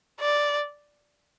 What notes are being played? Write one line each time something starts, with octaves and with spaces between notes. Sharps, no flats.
D5